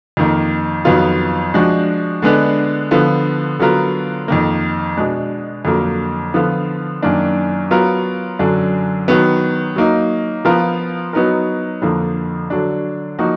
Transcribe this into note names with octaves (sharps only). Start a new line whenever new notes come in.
F2 D#3 A#3
F2 D#3 F#3 B3 F4
F3 G#3 D4 F#4
D3 G#3 B3 D4
D3 F3 B3 F4
D3 F#3 B3 F4 A#4
F2 D#3 A#3
B2 G#3 D4
F2 D3 F#3 A#3
D3 F3 B3 F4
F#2 D#3 A#3 D4
F#3 B3 F4 A#4
F#2 D3 F#3 D4
D#3 F#3 B3
F#3 A#3 D#4
F3 B3 F4 A#4
F#3 B3 D#4 A#4
F2 D3 F3 A#3
D3 F#3 D4
F3 A#3 D#4 F#4